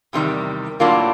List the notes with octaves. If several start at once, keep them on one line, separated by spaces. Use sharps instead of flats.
E2 C3 D#3 G3
A2 F#3 A#3 D4 F4